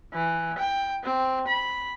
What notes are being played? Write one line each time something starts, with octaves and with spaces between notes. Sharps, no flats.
E3
G5
C4
B5